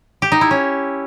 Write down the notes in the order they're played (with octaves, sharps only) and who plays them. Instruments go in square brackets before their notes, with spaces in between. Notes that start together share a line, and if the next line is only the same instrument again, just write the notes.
[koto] G4
D#4
E4
C#4